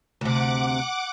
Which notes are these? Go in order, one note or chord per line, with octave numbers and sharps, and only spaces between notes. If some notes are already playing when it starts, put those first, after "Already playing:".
D2 C3 F#5 D6